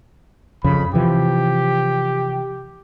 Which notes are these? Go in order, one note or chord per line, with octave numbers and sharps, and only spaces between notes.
F2 C#3 B5
C3 E3 F3 G4